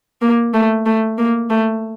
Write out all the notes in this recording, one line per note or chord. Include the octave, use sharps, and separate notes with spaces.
A#3
A3
A3
A#3
A3